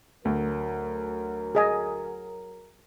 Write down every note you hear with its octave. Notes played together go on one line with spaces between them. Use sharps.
D2 F#3 A#4
G#4 D#5 G#5